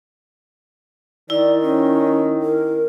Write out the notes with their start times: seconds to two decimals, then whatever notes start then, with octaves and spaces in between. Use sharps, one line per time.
1.30 D#3 E4 D5
1.62 C#4
2.42 A#4